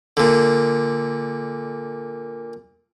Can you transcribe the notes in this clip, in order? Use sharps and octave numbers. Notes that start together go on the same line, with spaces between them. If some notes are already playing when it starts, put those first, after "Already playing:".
A#2 D3